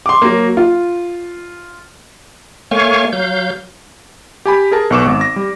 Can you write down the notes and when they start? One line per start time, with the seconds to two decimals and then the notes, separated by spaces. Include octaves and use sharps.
0.06 C6 D6
0.22 F#3 A#3
0.57 F4
2.71 A3 A#3 C#5 F5 G#5 C#6
3.13 F#3 F5 G6
4.45 G4 G#5 B5
4.71 G#4 A#4 A5
4.90 B1 B3 C#6 D6 E7
5.06 G#1
5.21 A#6
5.36 G3